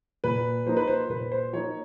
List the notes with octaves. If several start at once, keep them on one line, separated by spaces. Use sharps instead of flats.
A#2 B4
F3 A#3 D#4 C5
B4
C5
A#2 B4
C5
F3 A#3 D#4 C#5